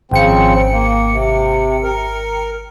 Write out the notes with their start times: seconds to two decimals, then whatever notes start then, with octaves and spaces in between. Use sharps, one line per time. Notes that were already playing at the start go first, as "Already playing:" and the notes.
0.12 G#1 C#3 F3 C4 G5 C#7
0.72 A#3
1.12 C3
1.84 A#4